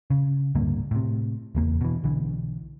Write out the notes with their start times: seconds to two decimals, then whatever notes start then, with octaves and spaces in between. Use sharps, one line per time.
0.10 C#3
0.55 D1 G2 D3 A#3
0.91 A2 C3
1.55 F#1 E2 A#3
1.81 B2 E3
2.04 B1 D3 E3